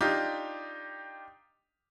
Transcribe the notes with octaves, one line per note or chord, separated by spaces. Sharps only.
D4 D#4 F4 G4